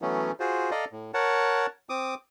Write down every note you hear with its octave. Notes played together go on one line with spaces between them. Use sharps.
E3 F#3 A3 B3 C#4
F4 F#4 G#4 C5
A4 D5 D#5 F5 A#5
A2
A#4 C#5 F#5 A5
C4 D6 D#6